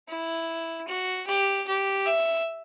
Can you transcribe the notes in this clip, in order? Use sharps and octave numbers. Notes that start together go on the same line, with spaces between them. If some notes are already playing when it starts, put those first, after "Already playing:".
E4
F#4
G4
G4
E5